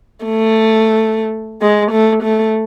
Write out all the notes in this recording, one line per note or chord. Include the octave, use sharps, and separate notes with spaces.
A3
G#3
A3
A3